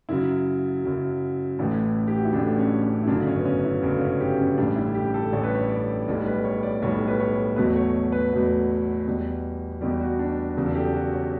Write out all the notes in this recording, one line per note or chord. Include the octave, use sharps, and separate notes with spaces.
F#2 C#3 F#3 E4
F#2 C#3 F#3
A1 A2 E3 A3
G4
F#4
E4
A1 A2 E3 A3 D4
C#4
C#4
E4
G1 F#2 C#3 F#3 D4
C#4
B3
C#4
E4
G1 F#2 C#3 F#3 C#4
C#4
G4
C#4
A1 A2 G3 D4
E4
G4
A4
A1 A2 G3 C#5
B4
C#5
D5
B1 A2 G3
B4
C#5
D5
B1 A2 G3 C#5
B4
C#5
E2 B2 F#3 A3 B4
C#5
B4
E2 B2 F#3 A3
E2 B2 G3
E2 B2 G3 G4
F#4
D4
E1 E2 C#3 F#3
A4
G4
F#4
C#5